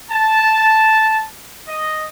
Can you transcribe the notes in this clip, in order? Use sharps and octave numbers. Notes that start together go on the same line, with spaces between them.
A5
D#5